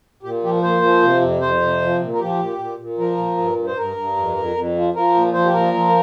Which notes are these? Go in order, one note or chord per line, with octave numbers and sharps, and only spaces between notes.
A#2 G4
F3 G4
A#2 C5
F3
C3
F2
F2 C5
C3
F3
A#2
A#4
F3 G4
A#2
A#2
A#2
F3 A#4
A#2
G2
G2
C5
G2 A#4
G2
F2
F2
F2
F3
F3 A#4
A#2
F3 C5
G4
A#2 A#4
F3